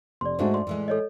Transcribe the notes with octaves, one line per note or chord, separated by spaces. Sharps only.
F1 D5 C6
G#2 G#3 A3 D4 F#4 C5
D5 C6
A2 E3 G#3
A4 C#5 D#5